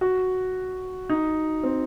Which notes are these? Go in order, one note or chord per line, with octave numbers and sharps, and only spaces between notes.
F#4
D#4
C4